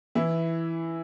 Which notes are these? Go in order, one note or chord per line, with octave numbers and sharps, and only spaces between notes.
E3 E4